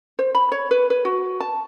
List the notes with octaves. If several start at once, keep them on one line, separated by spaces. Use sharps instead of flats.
C5
B5
C#5
B4
B4
F#4
A5